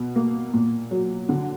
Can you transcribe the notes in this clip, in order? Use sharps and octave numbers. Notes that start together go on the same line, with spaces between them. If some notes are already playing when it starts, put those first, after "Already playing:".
Already playing: B2
A#3
A#2
F#3
D3